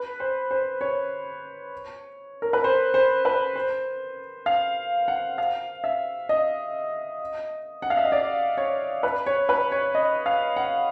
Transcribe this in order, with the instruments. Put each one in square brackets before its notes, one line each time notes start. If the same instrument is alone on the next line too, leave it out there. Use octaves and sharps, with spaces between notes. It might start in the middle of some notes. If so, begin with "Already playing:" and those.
Already playing: [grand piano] B4
C5
C5
C#5
A#4
B4
C5
C5
B4
C5
F5
F#5
F5
E5
D#5
F#5
F5
E5
D#5
D5
C#5
B4
C#5
B4
C#5
D#5
F5
F#5